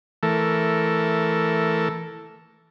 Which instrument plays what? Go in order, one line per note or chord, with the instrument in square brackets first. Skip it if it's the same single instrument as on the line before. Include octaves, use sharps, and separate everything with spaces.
[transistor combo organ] E3 A3 A4 A#4